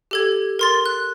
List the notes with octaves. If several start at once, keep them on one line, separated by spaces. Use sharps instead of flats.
G4 A4 G#6
A#4 C6 A6
F#6